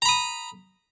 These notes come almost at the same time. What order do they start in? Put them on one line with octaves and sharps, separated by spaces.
A#5 B5 D#6